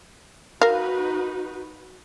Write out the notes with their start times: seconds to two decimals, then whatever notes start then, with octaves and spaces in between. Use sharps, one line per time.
0.61 D#4 F#4 A#4 B4 F5